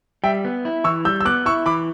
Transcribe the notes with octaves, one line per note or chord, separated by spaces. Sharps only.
G3 E5 G5
B3
E4
E3 C#6 E6
G3 E6 G6
E6
B3 D6 F#6
E4 C#6 E6
E3 B5 D6